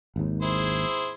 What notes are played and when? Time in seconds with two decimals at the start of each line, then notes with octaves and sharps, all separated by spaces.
0.16 G#1 D#2
0.42 E4 G#4 C5